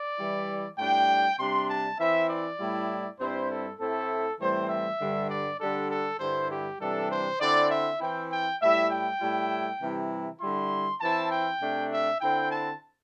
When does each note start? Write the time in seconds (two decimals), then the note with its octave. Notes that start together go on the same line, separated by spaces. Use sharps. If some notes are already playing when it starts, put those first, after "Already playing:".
Already playing: D5
0.18 E3 G3 E4
0.79 A2 G3 D4 G5
1.39 C3 G3 D4 C6
1.69 A5
1.99 E3 C4 E4 E5
2.29 D5
2.59 A2 G3 E4
3.19 G2 G3 C4 E4 C5
3.50 A4
3.79 A2 A3 C4 E4 A4
4.40 A2 E3 G3 C4 C5
4.70 E5
5.00 G2 D3 G3
5.30 D5
5.60 D3 G3 D4 A4
5.90 A4
6.20 G2 D3 G3 E4 C5
6.51 G4
6.80 C3 E3 G3 D4 A4
7.10 C5
7.40 D3 C4 E4 D5
7.70 E5
8.00 E3 C4 E4 G5
8.31 G5
8.61 A2 G3 E4 E5
8.90 G5
9.20 A2 G3 E4
9.80 C3 E3 G3 E4
10.41 D3 G3 E4 C6
11.01 E3 C4 E4 A5
11.32 G5
11.61 C3 A3 D4
11.92 E5
12.21 D3 C4 E4 G5
12.51 A5